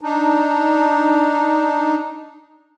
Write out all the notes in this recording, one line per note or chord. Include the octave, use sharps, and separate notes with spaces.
D4 D#4